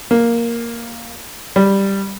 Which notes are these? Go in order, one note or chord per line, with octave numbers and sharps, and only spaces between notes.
A#3
G3